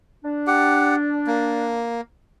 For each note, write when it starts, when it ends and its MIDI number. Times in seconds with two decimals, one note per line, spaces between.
0.24 1.86 62
0.47 0.96 67
0.47 0.96 78
1.27 2.01 58